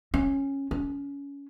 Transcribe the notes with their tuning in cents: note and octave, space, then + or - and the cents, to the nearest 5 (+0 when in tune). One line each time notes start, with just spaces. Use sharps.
C#4 -10
C#4 +25